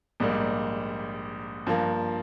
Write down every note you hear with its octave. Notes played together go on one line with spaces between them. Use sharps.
A#1 G#2 G3 A#3
G2 F3 A#3